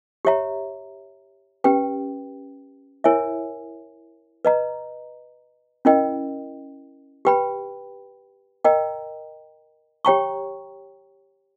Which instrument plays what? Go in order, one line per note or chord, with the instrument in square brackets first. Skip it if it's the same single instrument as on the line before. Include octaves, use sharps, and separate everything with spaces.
[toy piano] G4 C#5 E5 A#5
C#4 G4 B4 G5
E4 A#4 C#5 E5 G#5
B4 D#5 A#5
C#4 E4 A#4 D#5 G5
G4 B4 G5 B5
A#4 D#5 G5 A#5
G4 C#5 G5 A#5 C#6